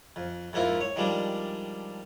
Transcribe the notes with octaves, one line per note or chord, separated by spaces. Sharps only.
F2
F2 G#2 A#3 E4 F4
C#5
D#3 F3 G3 G#3 D4